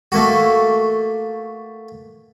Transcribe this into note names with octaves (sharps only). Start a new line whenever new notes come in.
A3 A#3 F#4